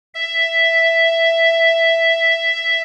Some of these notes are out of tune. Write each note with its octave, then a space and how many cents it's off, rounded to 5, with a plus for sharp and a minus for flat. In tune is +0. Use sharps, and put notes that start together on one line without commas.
E5 +5